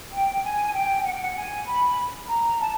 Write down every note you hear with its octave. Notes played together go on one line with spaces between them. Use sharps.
G5
G#5
G5
F#5
G5
F#5
G#5
B5
A#5
A5